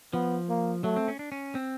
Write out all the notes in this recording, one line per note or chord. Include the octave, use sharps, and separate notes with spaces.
F3 B3
A#3
F#3 A3
C4
C#4
D4
C#4
C4